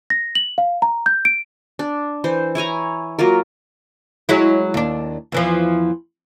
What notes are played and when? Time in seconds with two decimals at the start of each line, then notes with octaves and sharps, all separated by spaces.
0.10 A#6
0.35 F#7
0.58 F5
0.82 A#5
1.06 G6
1.25 D7
1.79 D4
2.24 E3 C5
2.55 E4 C#5 G#5 A#5
3.19 F#3 A#3 F4 A#4
4.29 F#3 G#3 E4
4.74 D#2 D4
5.32 E2 E3 F3